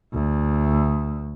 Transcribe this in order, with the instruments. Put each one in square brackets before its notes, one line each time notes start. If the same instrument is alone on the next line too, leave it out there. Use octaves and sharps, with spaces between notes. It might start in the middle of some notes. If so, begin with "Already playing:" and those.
[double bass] D2